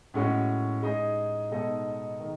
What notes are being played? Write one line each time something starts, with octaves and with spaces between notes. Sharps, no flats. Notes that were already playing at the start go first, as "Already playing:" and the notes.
A2 G#3 C#4 F#4
G#3 D#4 G#4 D#5
B2 G#3 D#4 A4 D#5
D#3